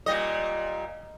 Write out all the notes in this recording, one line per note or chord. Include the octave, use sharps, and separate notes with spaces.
A#2 G3 D#5